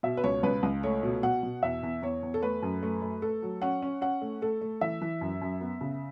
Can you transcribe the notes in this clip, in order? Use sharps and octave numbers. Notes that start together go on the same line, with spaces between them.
B2 E5
B4
C#2 C#5
C#2 B4
C#2
A3 C#5
B2
B2 F#5
B2
E2 E5
E2
E2 C#5
E2
A4
A3 B4
F#2
A3
A3
A3 A4
F#3
C#4 F#5
C#4
C#4 F#5
A3
A3 A4
A3
E3 E5
E3
F#2
F#2
B3
C#3